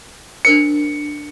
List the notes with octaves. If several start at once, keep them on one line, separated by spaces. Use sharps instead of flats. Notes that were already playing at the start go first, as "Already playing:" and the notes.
D4 A#4 C5 C#7